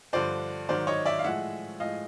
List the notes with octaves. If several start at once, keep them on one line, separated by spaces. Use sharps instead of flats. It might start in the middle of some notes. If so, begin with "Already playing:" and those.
G2 D3 F3 C5 D5
G#2 D#3 F#3 C5 D5
C#5 D#5
D5 E5
F5
A2 F3 G#3 E5 F#5
A2 F3 G#3 D#5 F5